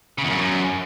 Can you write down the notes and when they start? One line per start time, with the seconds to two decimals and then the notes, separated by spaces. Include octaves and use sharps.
0.18 C#3
0.24 E2
0.30 F#2